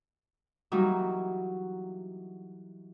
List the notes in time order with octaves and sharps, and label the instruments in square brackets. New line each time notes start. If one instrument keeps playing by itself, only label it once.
[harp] E3 F#3 G3 A#3 D#4 F#4